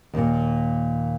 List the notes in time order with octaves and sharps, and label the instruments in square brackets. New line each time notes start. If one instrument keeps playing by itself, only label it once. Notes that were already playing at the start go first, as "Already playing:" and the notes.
[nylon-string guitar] D#2 A#2